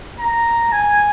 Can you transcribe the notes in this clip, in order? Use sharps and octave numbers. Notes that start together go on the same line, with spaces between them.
A#5
G#5